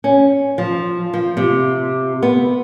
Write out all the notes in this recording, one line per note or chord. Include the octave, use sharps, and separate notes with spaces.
C#4
F3
F3
C3
B3